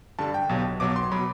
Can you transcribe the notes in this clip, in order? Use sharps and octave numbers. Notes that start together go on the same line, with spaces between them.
G2 D3 G3 A5
G5
B1 B2 F#3
B1 B2 F#3 D6
C6
B2 F#3 B5